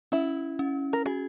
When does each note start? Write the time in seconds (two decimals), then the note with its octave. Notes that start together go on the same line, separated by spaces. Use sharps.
0.12 C#4 E4
0.59 C#4
0.93 A#4
1.06 F#4 G#4